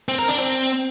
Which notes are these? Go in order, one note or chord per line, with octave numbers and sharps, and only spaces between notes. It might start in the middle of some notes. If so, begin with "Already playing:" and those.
C4
A#4
D4
C4